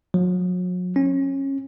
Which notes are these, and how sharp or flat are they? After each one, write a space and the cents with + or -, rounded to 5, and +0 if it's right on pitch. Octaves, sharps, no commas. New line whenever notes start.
F#3 -40
C#4 -25